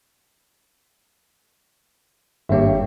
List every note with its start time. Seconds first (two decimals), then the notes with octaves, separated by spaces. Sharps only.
2.49 G#1 G2 A#3 G4 C#5 E5